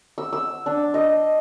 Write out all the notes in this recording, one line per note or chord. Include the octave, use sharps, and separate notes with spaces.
E6
E6
D4
D#5